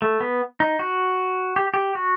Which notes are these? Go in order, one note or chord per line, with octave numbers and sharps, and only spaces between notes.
A3
B3
D#4
F#4
G4
G4
F#4